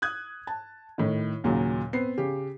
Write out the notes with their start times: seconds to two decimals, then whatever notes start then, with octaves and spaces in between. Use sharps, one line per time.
0.02 D#6 F#6 G#6
0.47 A5
0.98 A2 D#3
1.44 D#2 A#2 C#3 F#3
1.93 B3 C4 C7
2.18 C#3 G4